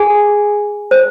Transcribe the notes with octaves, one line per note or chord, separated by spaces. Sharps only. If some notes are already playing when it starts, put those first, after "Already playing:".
Already playing: G#4 G#5
C5